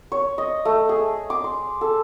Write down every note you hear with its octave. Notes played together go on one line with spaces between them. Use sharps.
C#5
D#5
A3
G#4
D6
C6
A4